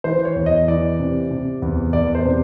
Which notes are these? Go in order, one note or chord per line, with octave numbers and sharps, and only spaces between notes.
E3 C5
C#5
E2
D#5
E3 D5
C3
C3
E2
E2 D5
C5
C3